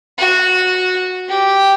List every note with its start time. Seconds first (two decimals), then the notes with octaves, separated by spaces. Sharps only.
0.18 F#4
1.28 G4